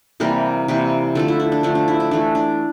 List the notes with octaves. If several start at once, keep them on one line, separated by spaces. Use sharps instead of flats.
C3 E3 G3 A#3 A#4
C3 E3 G3 A#3
D3 F3 A3 A4
E4
E4
D4
D3 F3 A3 E4
D4
E4
D4
E3 A3 D4
D4